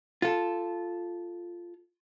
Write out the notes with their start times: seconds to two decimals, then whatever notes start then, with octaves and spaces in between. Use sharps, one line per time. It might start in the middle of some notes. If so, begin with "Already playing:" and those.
0.22 F4 A4